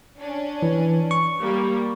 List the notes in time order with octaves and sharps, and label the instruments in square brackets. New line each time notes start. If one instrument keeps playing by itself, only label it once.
[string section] C#4 D4
[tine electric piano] E3
C#6
[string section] G3 A#3